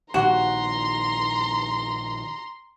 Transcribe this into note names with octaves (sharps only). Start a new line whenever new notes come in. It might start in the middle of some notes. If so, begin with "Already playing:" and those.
A#1 D#3 F#4 A#5 C6